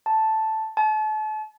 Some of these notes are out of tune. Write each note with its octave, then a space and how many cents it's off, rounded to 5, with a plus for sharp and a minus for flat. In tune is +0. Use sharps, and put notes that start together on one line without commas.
A5 +0
A5 -35